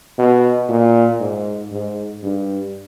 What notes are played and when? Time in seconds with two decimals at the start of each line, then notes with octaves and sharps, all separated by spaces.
0.18 B2
0.69 A#2
1.20 G#2
1.72 G#2
2.23 G2